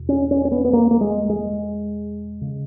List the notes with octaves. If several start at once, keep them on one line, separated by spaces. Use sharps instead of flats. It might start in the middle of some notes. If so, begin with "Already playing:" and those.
Already playing: E2 B2
C#4
C#4
C#4
B3
B3
A#3
A#3
G#3
G#3
C#3